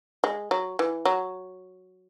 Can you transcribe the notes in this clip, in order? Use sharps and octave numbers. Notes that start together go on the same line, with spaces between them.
G#3
F#3
E3
F#3